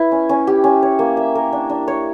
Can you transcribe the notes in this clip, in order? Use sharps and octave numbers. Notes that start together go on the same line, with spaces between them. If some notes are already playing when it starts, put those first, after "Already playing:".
Already playing: E4 B4
C#4
C#4
G4
C#4
C#5
A#3
E5
A#4
D4
D4
C#5